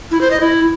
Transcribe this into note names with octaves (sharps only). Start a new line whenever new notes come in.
E4
C5
D#5
E4